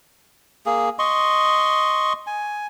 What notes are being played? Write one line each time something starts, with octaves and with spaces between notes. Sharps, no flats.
A#3 G#4
D#5 C6 C#6
G#5